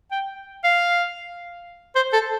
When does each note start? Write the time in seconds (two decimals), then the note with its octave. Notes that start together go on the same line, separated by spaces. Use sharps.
0.11 G5
0.64 F5
1.96 C5
2.13 A4